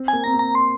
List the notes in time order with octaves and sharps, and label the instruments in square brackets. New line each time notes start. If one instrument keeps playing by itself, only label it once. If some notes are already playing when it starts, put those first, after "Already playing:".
Already playing: [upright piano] C4
[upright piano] A#3 [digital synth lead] G#5
[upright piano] C4 [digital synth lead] A#5
[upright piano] A#3
[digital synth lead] A#5
C6